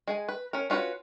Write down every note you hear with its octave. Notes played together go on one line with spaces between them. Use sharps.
G#3 G#4 G#5
B4
C#4 A#4
C#4 F4 F#4 A4 B4